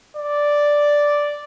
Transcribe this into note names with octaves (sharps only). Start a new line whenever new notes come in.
D5